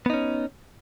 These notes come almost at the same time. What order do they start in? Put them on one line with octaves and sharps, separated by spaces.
B3 D#4 C#4